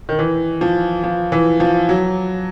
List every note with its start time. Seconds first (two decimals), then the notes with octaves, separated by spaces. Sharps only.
0.09 D#3
0.19 E3
0.61 F3
1.04 F3
1.32 E3
1.60 F3
1.89 F#3